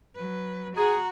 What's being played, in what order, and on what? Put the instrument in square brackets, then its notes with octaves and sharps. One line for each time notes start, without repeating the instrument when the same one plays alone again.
[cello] F#3 B4
[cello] F#4 F#5 [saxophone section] G#4 [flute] A#5